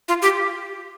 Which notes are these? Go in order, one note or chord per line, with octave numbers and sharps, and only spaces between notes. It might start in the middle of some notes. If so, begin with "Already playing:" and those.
F4
G4